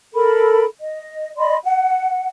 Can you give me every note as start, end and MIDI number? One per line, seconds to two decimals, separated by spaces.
0.13 0.65 69
0.13 0.65 70
0.13 0.65 83
0.80 1.31 75
1.37 1.56 74
1.37 1.56 75
1.37 1.56 83
1.37 1.56 84
1.64 2.28 78